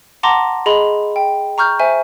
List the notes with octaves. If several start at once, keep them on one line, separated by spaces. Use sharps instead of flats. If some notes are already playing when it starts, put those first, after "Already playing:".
F#5 A5 A#5 C6 D6 A#6
G#4 D#5 B5 C6
G5
A#5 C#6 F6 G6
C5 E5 G#5